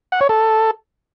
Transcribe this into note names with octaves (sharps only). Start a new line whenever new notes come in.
F#5
C#5
A4